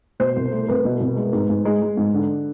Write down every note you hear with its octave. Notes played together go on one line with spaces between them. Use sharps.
B2 C5
C2
A3
C2 B4
B2
C2
G#3
G#2
G#2
G#3
G#3
G#2
D3